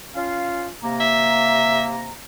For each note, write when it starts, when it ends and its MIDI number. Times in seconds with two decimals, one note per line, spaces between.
0.15 0.68 61
0.15 0.68 65
0.15 0.68 77
0.82 2.12 48
0.82 2.12 58
0.82 2.12 82
1.00 1.85 76